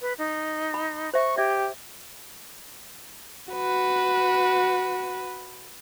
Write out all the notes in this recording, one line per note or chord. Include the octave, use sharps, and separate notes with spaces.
B4
D#4
B5
C5 E5 C#6
G4 D5 E5
F#4 B4